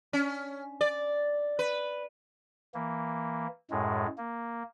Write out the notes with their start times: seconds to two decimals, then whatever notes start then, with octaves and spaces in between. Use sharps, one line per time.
0.13 C#4
0.81 D5
1.59 B4
2.74 E3 A#3
3.71 F#2 A2 G#3
4.18 A#3